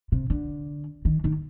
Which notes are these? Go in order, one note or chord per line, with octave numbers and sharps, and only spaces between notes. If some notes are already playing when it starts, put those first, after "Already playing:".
C3
D3
D#3
D#3